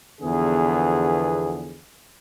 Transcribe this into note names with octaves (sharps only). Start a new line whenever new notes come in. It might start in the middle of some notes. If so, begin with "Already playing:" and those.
E2 D3 F3 B3 G#4